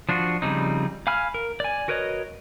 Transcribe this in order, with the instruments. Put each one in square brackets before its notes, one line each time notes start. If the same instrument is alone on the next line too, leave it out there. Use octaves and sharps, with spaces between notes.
[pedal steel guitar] F3 D4 F4 F#4
C#3 F3 G3 C4 D#4
F5 G#5 B5 F6
A#4
D5 G#5
F#4 A#4 B4 C#5 D#5